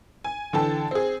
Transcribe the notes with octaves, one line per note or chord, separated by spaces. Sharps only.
G#5
D3 E3 A4 G5 A5
C4 G#4